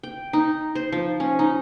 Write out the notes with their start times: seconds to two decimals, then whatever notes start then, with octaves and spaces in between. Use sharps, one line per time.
0.03 G5
0.33 D#4
0.75 C5
0.92 F3
1.20 C#4
1.39 D#4